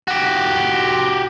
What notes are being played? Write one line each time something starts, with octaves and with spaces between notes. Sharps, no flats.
F#4 G4